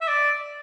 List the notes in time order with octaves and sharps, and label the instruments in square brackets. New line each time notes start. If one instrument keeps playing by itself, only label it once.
[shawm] E5
D5